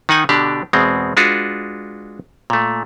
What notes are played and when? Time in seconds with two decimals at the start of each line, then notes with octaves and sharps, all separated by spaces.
0.09 D#3 D#4 F#5 G#5
0.29 B2 D3 D4 G4 D5
0.73 E2 B2 G#3 C4
1.17 G#3 D4 F4 F#4 B4
2.50 A#2 A3